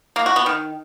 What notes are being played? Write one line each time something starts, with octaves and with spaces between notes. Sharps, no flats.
A#3
F#4
B3
D#3